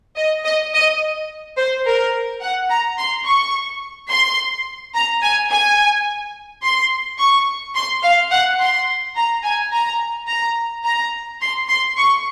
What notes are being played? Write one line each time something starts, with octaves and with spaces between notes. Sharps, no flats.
D#5
D#5
D#5
C5
A#4
F#5
A#5
C6
C#6
C6
A#5
G#5
G#5
C6
C#6
C6
F5
F#5
C6
A#5
G#5
A#5
A#5
A#5
C6
C6
C#6